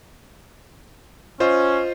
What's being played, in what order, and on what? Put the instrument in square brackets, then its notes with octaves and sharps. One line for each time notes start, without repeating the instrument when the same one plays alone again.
[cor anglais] C#4 [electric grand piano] F4 C5 D#5